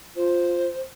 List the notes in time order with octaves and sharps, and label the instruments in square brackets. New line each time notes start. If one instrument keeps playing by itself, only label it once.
[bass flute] F4 [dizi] C5